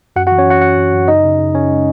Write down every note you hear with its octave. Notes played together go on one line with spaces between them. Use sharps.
F#2 F#4 F#5
F#4 F#5
E3
C#4 C#5
E3 F#4 F#5
F#2 F#4 F#5
F#2
F#2
C#3 D#4 D#5
C#3
C#3
C#3 C#4 C#5
G#3